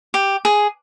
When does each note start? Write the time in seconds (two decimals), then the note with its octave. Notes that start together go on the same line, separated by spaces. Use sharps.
0.14 G4
0.45 G#4